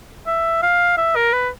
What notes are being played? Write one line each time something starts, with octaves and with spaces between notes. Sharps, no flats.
E5
F5
E5
A#4
B4